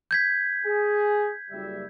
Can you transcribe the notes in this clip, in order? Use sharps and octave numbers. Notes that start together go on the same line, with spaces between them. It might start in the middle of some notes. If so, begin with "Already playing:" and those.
G6 G#6 B6
G#4
F#1 G3 E5